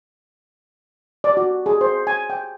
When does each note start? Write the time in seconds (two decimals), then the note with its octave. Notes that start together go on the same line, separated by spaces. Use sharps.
1.24 D5
1.37 F#4
1.66 G#4
1.81 C5
2.07 G#5
2.30 G5